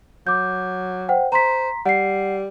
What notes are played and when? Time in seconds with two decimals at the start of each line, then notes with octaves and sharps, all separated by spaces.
0.27 F#3 D6 G6
1.09 C5 F#5 G5
1.32 C5 A#5 C6 B6
1.86 G3 F#5 C7